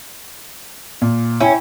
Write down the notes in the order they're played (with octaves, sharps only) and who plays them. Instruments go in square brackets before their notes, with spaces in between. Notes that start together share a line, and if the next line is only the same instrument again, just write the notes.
[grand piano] A#2
[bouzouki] C#4 [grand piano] E4 G5